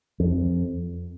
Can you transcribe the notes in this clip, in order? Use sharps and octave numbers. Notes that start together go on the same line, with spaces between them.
F2